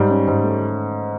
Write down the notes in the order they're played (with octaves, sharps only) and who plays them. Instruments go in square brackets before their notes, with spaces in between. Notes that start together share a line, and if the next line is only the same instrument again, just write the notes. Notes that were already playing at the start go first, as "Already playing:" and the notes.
Already playing: [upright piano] G#2 [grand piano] G3
[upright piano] C#4
G#2
A3